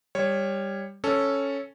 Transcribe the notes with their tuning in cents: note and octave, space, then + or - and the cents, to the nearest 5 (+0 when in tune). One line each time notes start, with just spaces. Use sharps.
G3 +15 C#5 -10
C#4 +0 A4 +0